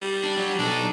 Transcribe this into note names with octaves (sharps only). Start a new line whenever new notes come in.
G3
D4
F#3
B1 D4 D#4